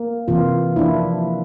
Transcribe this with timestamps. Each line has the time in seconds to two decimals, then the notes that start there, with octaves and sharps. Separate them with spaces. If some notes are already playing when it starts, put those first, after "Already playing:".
Already playing: A#3
0.28 C3 E3 A#3 F4
0.76 F3 A#3 D4 E4